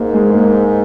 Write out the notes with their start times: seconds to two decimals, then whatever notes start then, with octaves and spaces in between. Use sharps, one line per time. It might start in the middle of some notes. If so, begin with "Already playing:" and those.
Already playing: G#2 A#3
0.14 G#3
0.30 G#3
0.34 A#3